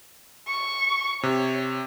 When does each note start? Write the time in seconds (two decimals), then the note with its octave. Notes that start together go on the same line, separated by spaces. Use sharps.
0.47 C#6
1.23 C3 C#5